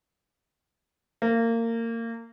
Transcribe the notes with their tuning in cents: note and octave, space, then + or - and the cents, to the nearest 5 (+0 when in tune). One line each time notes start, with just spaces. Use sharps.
A#3 -25